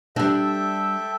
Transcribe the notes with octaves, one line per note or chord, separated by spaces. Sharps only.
G3 D4 A4 E5 G5